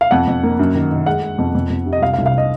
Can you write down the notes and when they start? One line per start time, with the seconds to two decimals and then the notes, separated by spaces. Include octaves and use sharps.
0.01 F5
0.11 F2 F#5
0.27 F2
0.43 A#3
0.59 F#2
0.75 D#3
0.91 D#3
1.06 G#3 F#5
1.22 G#3
1.38 F2
1.55 F2
1.70 F2
1.86 C3
1.93 D#5
2.01 C2 F5
2.13 F5
2.18 C2
2.26 F5
2.38 D#5